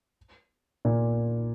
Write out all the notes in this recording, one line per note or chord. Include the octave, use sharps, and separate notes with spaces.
A#2